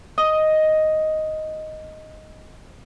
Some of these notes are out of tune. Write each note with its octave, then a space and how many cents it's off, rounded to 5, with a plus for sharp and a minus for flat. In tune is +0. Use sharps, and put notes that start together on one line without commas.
D#5 +5